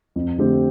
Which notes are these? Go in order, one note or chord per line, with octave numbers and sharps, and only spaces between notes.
F2
D3 A3 C4 G4